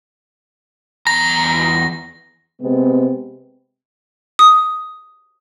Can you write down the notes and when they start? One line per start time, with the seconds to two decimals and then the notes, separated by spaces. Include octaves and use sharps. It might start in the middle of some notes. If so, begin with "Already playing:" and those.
1.07 E2 A#5 A#6
2.61 C3 G#3 B3 C4
4.39 D#6